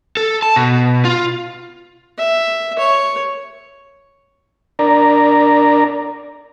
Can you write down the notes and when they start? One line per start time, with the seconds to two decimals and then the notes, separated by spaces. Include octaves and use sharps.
0.17 A4
0.42 A5
0.56 B2
1.05 F4
2.18 E5
2.79 C#5
4.79 D4 A#4 D5 A#5